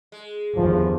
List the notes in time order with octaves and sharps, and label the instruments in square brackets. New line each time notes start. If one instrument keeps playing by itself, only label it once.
[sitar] G#3
[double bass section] G1 E2 [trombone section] D#3 F3